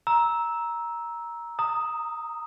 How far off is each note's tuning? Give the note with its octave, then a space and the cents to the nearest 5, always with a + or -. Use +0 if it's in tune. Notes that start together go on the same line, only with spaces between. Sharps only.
A#5 +10 E6 -10
A#5 -20 D#6 +0